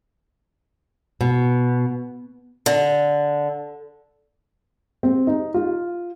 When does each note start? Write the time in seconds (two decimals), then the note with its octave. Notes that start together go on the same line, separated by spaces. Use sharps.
1.21 B2
2.66 D3
5.03 C4
5.27 D#4
5.54 F4